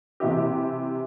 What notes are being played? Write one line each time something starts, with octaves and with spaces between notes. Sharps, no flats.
C3 E3 E4 G4